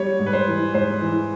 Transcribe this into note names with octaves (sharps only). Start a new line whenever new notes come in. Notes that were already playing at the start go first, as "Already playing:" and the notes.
Already playing: G3 C#5
G#2
B4
C5
E3
G#2 C5
E3